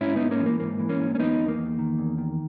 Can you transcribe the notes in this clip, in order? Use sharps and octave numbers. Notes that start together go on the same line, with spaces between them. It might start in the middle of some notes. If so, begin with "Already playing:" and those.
G#2 C#4 E4
G#2 B3 D#4
A#3 C#4
E3
A#3
G#2 A#3
E3
A#3 C#4
G#2
C#4
E2 B3 D#4
E2
A#3
E2
D#3
E2
D#3